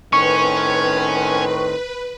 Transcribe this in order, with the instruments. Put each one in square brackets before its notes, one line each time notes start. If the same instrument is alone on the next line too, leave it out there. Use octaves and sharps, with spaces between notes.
[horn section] A2 D#3 C4 [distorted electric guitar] C#4 [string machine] B4 [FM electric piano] C#6